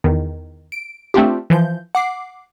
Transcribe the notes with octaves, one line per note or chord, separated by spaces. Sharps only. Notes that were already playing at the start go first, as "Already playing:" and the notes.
E2 D#3
D7
A3 C4 D4 F4 G4
E3 F3 G6
F#5 D6 C7